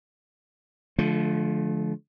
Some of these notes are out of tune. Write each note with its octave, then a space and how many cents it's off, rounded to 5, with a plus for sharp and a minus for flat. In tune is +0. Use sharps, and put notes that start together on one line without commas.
D3 +0 F3 +0 A3 -35